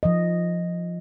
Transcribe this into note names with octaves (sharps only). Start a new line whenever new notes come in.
F3 D#5